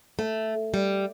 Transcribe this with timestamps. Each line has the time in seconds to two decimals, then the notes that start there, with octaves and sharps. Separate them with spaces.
0.19 A3
0.74 G3